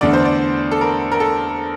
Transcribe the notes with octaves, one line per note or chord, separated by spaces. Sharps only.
E2 D3 A3 D5
C5
D5
A4
A#4
A#4
A4